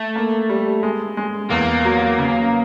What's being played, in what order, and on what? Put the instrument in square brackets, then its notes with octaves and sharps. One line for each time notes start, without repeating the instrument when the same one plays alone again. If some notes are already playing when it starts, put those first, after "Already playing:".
Already playing: [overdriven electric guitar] A3
[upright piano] A#3
G3
G#3
G#3
[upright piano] E2 [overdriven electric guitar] A#3
[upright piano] F#3
C#3